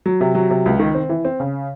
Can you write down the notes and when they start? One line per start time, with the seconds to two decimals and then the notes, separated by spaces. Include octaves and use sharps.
0.06 F#3
0.21 C3
0.35 F#3
0.50 C3
0.66 C#2
0.79 D#3
0.95 C4
1.09 E3
1.25 C4
1.40 C#3